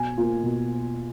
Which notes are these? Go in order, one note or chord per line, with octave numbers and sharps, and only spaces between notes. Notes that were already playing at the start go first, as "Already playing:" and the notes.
Already playing: B2 G#5
A#3 F4
B2